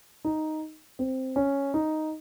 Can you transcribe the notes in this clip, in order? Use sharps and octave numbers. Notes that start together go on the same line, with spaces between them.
D#4
C4
C#4
D#4